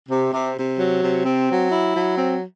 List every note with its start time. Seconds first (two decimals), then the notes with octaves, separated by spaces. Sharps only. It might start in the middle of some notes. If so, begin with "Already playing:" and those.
0.09 C3
0.32 C3
0.56 C3
0.79 F#3
1.02 C3
1.25 C4
1.48 F#3
1.72 E4
1.94 F#3
2.18 C4